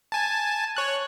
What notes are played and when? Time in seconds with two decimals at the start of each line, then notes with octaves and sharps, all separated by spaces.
0.12 G#5 A5
0.76 C#5 F#6